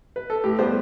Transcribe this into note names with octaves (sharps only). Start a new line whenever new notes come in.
B4
A4
A2 G4
G3 B3 C5